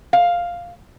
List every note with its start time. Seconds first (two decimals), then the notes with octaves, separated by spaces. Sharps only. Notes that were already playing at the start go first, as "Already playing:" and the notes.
0.13 F5